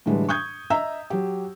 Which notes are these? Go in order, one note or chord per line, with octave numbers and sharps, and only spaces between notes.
A2 D3 E3 G3 G#3
C#6 D#6 G6 G#6
D#5 E5 A#5 E6
F#3 G4